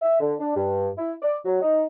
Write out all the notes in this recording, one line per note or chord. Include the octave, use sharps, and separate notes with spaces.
E5
D3
D4
G2
E4
D5
F#3
D#4